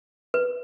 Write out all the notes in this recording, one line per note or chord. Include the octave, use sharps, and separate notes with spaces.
B4